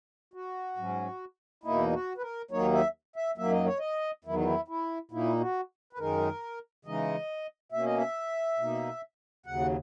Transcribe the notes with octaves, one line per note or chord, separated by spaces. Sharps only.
F#4
G#2 F#3 C#4
E2 B2 A#3 D#4 E4
F#4
B4
A#4
D#2 D#3 F#3 A#3 D#4 C#5
E5
E5
F#2 D#3 F#3 A#3 E5
D#5
C#5
D#5
E2 D#3 F#3 E4
D#4
E4
E4
A#2 A#3 D#4 E4
F#4
B4
F#2 D#3 G#3 D#4 A#4
C#3 E3 G#3 D#4 D#5
B2 A#3 C#4 E5
D#5
E5
B2 A#3 D#4
D#2 C#3 F#3 F#5